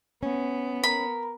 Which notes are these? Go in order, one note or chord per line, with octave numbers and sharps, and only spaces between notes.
B3 C#4
A#4 B5